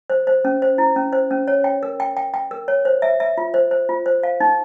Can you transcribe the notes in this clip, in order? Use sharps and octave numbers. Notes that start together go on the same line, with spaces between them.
C5
C5
C#4
C5
E4
C#4
C5
C#4
C#5
G5
A#4
G5
G5
G5
A#4
C#5
C5
E5
E5
F4
C5
C5
F4
C5
F5
D#4